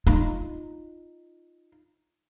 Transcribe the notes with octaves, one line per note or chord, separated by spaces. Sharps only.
D#4 F4